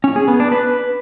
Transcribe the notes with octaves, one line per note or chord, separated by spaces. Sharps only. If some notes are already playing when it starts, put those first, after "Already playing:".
C#4
G#4
B3
D4
B4